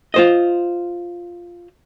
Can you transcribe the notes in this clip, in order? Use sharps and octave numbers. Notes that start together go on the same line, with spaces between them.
F4 C5 D#5